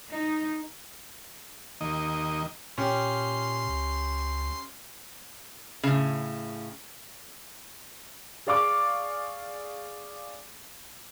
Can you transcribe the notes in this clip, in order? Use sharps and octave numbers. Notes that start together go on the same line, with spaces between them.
D#4
D#2 D#3 A#3 D#5
A#2 C#4 G4 C6
C#2
A2 C#3
G#4 D5 F5 C#6 D6